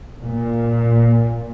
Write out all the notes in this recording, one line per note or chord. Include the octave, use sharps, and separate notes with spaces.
A#2